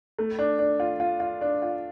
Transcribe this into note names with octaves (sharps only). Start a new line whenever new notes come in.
A3
D4
D4
F4
F4
F4
D4
F4